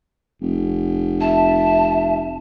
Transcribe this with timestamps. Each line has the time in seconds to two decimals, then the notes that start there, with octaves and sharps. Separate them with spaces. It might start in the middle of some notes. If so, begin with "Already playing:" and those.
0.42 F1
1.21 E5 A5